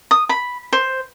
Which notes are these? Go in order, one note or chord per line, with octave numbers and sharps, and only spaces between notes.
D#6
B5
C5